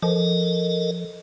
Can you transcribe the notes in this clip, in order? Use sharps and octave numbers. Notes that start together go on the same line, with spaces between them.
F3 A4 A#4 D#5